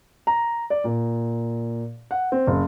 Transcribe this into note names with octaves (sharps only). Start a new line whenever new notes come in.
A#5
D5
A#2
F#5
C4
F#1